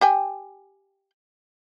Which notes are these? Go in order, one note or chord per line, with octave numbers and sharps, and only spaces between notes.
G4 G5 G#5